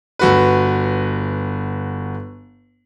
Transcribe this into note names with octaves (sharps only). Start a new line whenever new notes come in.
G1 F#4 B4